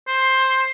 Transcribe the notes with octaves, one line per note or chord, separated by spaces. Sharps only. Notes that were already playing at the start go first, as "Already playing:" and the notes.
C5